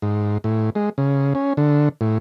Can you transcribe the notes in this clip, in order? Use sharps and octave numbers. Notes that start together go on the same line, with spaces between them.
G#2
A2
G#3
C#3
C#4
D3
A2